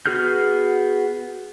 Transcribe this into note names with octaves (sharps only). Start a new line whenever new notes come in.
B3 F#4 G#4 F6 G6